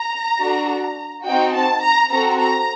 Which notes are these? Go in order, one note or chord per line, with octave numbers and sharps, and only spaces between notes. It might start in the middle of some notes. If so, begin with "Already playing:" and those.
Already playing: A#5
D4 F#4 A4
C4 D#4 F#4 G5
A5
A#5
C4 F#4 A4 A#5
A#5